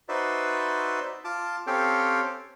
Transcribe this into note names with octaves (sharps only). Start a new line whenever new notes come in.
D#4 F#4 B4 C5 D5 E5
F4 A5 D6
C4 C#4 G4 A4 F5 G5